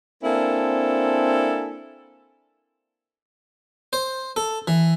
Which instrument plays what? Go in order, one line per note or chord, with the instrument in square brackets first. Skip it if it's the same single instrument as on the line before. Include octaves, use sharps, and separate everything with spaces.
[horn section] A#3 C4 D4 E4 A4 G#5
[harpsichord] C5
A4
E3